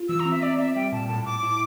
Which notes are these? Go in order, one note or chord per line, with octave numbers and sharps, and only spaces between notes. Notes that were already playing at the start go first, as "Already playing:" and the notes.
Already playing: F4
E3 E6
A#5
C4
E5
C4 D5
C4 E5
G3 G5
A#2 A5
A2 A5
A2 D6
E4